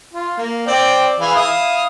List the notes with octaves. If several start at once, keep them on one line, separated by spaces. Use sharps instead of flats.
F4
A#3
C4 D5 G5
E3 G#4 F5
E4 F5 D#6